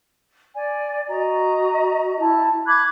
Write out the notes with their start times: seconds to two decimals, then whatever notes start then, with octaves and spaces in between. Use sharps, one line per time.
0.55 D5 G#5
1.08 F#4 D#5 A#5
2.19 E4 A5
2.66 B5 D6 F#6 G#6